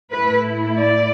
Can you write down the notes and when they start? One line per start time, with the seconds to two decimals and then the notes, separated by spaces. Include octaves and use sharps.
0.12 A2 A3 E4 B4
0.78 D5